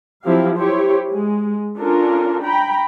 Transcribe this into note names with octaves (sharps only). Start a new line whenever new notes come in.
F3 F#3 C4 E4 G4 F5
E4 G4 C5 C#5
G#3
C#4 D4 F4 A4 A#4
G5 A#5 B5